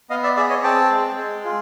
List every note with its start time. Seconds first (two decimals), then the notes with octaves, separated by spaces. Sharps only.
0.10 B3 D#5 F5
0.23 D5 E5
0.36 G#4 D5 E5
0.50 C#5 D#5
0.63 C4 G5 A5
0.91 G#3
1.18 G#4
1.45 F4